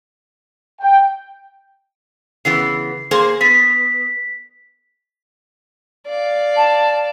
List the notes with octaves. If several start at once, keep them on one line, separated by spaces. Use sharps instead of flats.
G5
C#3 E3 B3 C7
A#3 G#4 C5
B3 B6
D5 F5
A5